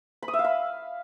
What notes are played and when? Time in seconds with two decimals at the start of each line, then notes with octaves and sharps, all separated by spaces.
0.22 B5
0.28 D#6
0.33 E5
0.39 F5
0.44 B5